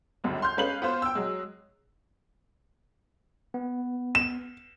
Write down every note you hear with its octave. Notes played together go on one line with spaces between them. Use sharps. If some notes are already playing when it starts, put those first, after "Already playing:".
G1 C#2 F#2
C6 F6 G6
G#3 C#4 B4 F5 F6 F#7
B3 F4 C5
G5 E6
F#3 G#3
B3
E7